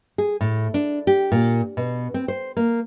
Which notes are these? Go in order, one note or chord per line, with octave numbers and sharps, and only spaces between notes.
G#4
A2
D4
G4
A#2
B2
C4
C5
A#3